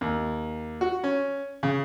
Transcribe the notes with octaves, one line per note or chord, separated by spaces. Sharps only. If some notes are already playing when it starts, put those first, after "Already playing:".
D#2
F#4
C#4
C#3